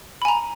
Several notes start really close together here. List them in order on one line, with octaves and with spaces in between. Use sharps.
B5 G#5 A#5